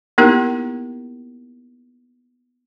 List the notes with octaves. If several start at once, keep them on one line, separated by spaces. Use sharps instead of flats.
A#3 B3 D#4 E4 G4 A#4